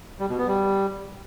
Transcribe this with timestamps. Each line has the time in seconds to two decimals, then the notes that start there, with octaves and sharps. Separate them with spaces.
0.20 G3
0.29 B2
0.38 B3
0.47 G3